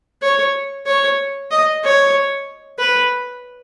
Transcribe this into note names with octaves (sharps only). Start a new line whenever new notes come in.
C#5
C#5
D#5
C#5
B4